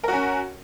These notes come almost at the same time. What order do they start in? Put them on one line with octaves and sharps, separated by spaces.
A#4 F#4 C#4